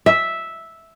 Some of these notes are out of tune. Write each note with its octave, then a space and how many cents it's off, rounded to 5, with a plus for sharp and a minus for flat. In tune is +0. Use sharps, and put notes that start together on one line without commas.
E5 -5